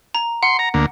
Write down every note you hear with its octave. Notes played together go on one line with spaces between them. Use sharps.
A#5
F#5 C6
A#5
D2 A#3